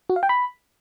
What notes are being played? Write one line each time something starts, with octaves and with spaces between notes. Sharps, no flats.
F#4
F5
G5
B5